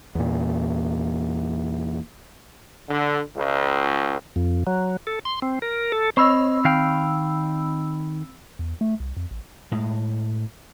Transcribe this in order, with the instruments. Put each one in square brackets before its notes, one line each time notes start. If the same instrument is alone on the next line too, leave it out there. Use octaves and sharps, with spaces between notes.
[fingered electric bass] E2 A#2
[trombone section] D3
C#2
[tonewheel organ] F2
F#3
A4
C6
C4
A#4
A4
[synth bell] C4 B5 E6 [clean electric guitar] C5 C#5 D#5
[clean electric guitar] D#3 F5 G5
[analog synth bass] E2
A3
C2
F2
A1
[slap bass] A2 G#3